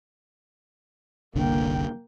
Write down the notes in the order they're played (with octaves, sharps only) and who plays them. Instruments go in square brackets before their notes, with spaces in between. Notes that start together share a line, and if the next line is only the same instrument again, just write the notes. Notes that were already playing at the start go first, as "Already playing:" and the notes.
[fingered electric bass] F#1 C2 D3 [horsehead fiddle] A#3 G5